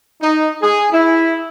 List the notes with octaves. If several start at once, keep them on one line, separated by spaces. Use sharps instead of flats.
D#4
G#4
E4